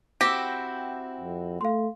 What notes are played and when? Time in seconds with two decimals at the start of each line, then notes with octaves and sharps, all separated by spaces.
0.21 C4 E4 F#4 G4 A#6
1.20 F2
1.61 A3 F5 C6